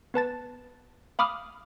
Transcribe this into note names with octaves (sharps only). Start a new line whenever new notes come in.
B3 B4 A5 A6
F5 B5 D6 D#6 F6